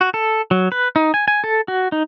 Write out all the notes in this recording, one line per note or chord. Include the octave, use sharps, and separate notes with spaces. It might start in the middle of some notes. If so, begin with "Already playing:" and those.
F#4
A4
F#3
B4
D#4
G#5
G#5
A4
F#4
D#4